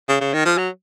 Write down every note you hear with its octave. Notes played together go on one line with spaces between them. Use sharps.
C#3
C#3
D#3
F3
F#3